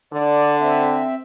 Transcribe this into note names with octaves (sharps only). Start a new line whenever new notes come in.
D3 D5
C4 E5